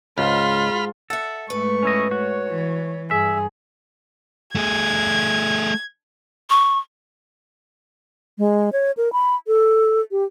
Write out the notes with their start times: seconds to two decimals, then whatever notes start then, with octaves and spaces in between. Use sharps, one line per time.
0.18 C#2 G#2 F4 B5 F6
1.10 A4 E5 F#5
1.50 G#2 A3 B4 C#6
1.83 C#4 E4 D#5
2.11 F#4 C#5
2.49 E3
3.11 G2 G#4 E5
4.55 A3 G#4 G#6
6.50 C#6
8.38 G#3
8.73 C#5
8.97 A#4
9.13 B5
9.47 A4
10.11 G4